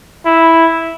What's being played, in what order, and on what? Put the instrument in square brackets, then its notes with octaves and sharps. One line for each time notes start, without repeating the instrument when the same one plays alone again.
[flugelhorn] E4